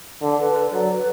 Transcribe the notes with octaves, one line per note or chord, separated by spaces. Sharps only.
D3
B4
A4
F#3 D5
B4